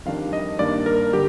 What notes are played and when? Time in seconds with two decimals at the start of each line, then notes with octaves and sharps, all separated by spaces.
0.05 F2 D#3 G3 D4 F5
0.33 D#5
0.59 G2 D#3 A#3 D4 D5
0.86 A#4
1.13 D3 G3 G4